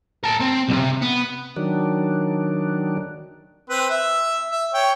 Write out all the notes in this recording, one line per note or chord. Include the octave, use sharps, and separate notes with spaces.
A#4 A5
C4
B1 C3
B3
D#3 F#3 D4
C4 B4
E5
E5
C#5 G5